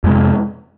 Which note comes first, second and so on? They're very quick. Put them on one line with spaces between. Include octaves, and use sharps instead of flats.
F2 G#3 C3